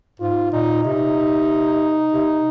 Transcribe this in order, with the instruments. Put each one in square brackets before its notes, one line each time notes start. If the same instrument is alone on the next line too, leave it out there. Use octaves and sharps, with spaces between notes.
[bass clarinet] G#2 [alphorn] F4
[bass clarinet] A#2 [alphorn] D#4
[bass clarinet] C3 [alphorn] D#4
[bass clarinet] C3